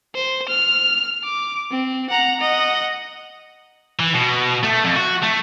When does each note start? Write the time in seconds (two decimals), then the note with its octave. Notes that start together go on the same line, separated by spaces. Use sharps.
0.14 C5
0.49 F6
1.24 D6
1.71 C4
2.10 F#5 A#5
2.41 D#5 F#5
3.99 E3
4.14 B2
4.63 A3
4.84 F2
4.97 F#4
5.23 A3